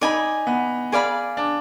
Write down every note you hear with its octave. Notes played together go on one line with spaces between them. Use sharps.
D#4 D5 G#5 B5
B3
G#4 D5 F5 B5
D4